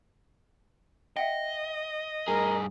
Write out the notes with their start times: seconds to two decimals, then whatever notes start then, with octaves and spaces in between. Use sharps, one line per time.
1.17 D#5 E5 F#5 G5
2.28 G2 G#4 A#4